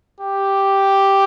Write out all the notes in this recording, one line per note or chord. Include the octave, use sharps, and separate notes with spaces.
G4